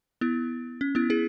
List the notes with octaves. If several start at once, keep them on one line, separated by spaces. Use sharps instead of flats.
B3 E4
C#4
B3 E4
E4 G#4